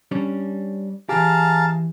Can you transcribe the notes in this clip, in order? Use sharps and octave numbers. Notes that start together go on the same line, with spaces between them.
G3 C#4 D4
E3 G4 G#4 F5 A5 A#5